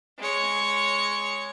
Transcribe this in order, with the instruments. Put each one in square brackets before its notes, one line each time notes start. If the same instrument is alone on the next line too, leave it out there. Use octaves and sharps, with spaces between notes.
[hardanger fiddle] G#3 C#5